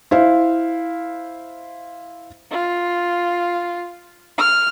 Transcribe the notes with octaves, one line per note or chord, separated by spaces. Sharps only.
E4 C5 F5
F4
F6